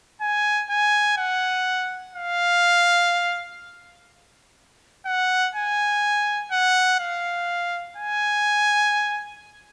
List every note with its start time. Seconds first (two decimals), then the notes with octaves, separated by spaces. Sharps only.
0.21 G#5
0.70 G#5
1.18 F#5
2.15 F5
5.06 F#5
5.55 G#5
6.52 F#5
7.00 F5
7.97 G#5